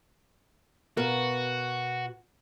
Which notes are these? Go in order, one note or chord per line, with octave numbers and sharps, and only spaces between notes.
B2 F#4 A#4 F5